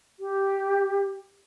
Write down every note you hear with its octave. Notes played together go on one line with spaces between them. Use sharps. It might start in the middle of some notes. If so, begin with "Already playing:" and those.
G4